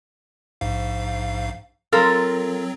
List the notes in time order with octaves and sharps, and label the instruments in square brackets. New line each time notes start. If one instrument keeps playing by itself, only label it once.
[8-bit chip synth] A#1 G#2 F5
[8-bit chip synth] F#3 C4 [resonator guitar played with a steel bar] F4 A4 A#4